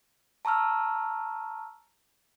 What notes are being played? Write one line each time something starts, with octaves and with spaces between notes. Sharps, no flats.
A5 A#5 C#6 E6 F6